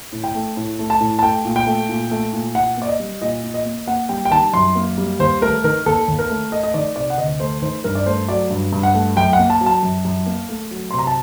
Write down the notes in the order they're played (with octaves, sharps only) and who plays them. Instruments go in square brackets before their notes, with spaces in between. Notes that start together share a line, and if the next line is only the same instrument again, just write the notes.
[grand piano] A2
G5
A3
A2
A3
A5
A2
A5
A3 G5
A#2
G5
A3
A#2
A3
A#2
A#2 F#5
A#3 D5
D#5
G3
A#2 D#5
A#2
D#5
A#3
A#3 F#5
G3 G5
G5
D#3 A5
F#2 C6
A#3
G3
D#2 C5
A3 A#4
D#3 A#4
D#2 A4
D#2
A#4
A3
A3 D#5
D#5
D#3 D5
C3 D5
F#5
D2 D#5
A3 C5
D#3 C5
G2 A#4
D5
A3 C5
F#3 D5
G2
G2
F#5
A3
F#2 G5
F#5
A#3
A5
F#3
A5
F#2
F#2
A#3
A3
F#3
C3 C6
A#5
A5